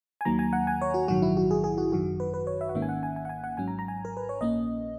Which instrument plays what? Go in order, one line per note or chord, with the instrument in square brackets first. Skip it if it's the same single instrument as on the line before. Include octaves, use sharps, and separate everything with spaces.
[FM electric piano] G#5
D#2 D#3 F#3 A#3 A#5
G#5
F#5
G#5
C#5
F#4
A#1 G#2 D#3 F#3 F#4
E4
F#4
G#4
G#4
F#4
G#1 F#2 D#3 F#4
B4
B4
C#5
E5
F#5
G#1 G#2 D#3 A#3 C#4 E5
G#5
F#5
G#5
G#5
F#5
G#5
F#5
G#1 G#2 F#3 C#4 G#5
A#5
A#5
G#5
A#4
B4
C#5
A#1 A#2 A#3 C#4 D#5